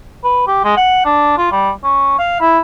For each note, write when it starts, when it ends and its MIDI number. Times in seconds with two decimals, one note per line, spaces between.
0.24 0.43 71
0.48 0.62 67
0.64 0.76 56
0.77 1.03 78
1.05 1.37 62
1.38 1.48 65
1.52 1.71 55
1.84 2.18 61
2.19 2.37 77
2.40 2.60 64